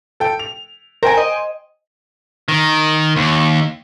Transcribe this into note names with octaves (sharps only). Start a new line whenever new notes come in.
A4 G5
F7
A#4 C5 G5 G#5
D#5
D#3
D#2